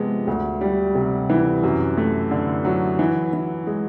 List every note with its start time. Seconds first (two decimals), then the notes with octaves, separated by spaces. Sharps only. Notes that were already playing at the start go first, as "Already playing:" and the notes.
Already playing: C3 F3 G#3 B3
0.27 D2
0.61 G3
0.95 C3
1.29 E3
1.63 F#2
1.97 A3
2.31 D3
2.65 F#3
2.99 E3
3.33 E3
3.67 G#3